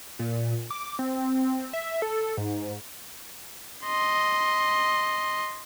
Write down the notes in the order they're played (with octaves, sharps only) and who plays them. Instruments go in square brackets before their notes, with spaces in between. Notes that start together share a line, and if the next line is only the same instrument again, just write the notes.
[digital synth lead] A#2
D6
C4
E5
A4
G#2
[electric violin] D#5 C6